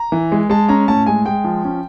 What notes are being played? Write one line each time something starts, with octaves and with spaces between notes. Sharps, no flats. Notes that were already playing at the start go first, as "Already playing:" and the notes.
Already playing: A#5
E3
G#3
G#3 A5
C#4 A#5
A2 A5
G#3 G#5
G#3 G5
F3
C#4